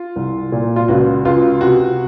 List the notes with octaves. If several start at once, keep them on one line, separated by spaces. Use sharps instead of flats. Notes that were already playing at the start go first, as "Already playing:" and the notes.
Already playing: F4
C2
A#2
F4
C#2 F#4
C#2 F4
C3 F#4